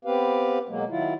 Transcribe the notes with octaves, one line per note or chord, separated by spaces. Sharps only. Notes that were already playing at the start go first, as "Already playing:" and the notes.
B3 C4 G4 B4 F5
B2 F#3 G#3 A#3
D#3 F#3 E4 F4